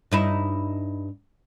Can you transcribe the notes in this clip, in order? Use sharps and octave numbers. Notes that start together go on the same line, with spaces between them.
G2 D#4 E4